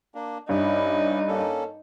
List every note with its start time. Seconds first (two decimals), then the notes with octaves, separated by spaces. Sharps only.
0.15 A#3 D4
0.49 G2 C#4 D#4 E4
1.28 A#3 C#4 A4